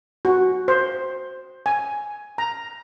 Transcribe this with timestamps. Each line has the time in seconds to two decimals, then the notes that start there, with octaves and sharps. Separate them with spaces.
0.25 F#4
0.68 C5
1.66 G#5
2.38 A#5